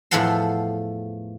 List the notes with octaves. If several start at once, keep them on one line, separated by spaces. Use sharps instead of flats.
E2 A2 F3 A4 F#5 C6